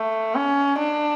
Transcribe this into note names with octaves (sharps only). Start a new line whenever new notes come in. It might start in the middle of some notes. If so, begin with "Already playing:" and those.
Already playing: A3
C#4
D4